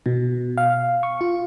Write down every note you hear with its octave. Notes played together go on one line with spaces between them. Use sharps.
B2
F5
C#6
F4